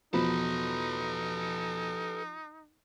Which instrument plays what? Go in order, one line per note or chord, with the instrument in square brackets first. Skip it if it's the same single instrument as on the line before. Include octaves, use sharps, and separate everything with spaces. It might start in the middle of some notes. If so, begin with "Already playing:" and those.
[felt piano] E2 B2 B5 [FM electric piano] F3 [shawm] D#4 [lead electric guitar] A4 B4